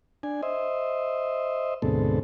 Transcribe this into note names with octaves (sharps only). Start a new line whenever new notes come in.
D4 G#5
C5 D#5 E5
D2 G#2 B2 C4 A4